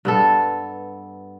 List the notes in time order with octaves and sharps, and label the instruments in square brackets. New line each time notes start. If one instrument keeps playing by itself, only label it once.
[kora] G2 B3 A4